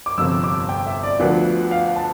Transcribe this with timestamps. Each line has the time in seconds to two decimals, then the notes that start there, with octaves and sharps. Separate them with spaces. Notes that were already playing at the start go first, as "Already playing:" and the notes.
0.06 D6
0.18 G1 F2 C3 E6
0.44 D6
0.69 G5
0.87 E5
1.03 D5
1.20 D2 D3 F3 B3 D4
1.71 F5
1.96 A5